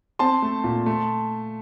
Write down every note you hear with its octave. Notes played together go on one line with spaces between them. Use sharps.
C4 A5 C6
A3
A#2
A3